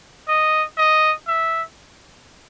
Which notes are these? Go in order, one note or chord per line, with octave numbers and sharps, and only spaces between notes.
D#5
D#5
E5